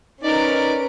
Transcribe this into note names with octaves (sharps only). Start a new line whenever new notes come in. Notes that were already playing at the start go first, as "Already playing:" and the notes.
C#4 D#4 A#4 B4 D5 D7